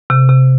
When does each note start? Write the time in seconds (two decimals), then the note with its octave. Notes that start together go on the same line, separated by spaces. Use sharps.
0.10 C3
0.29 C3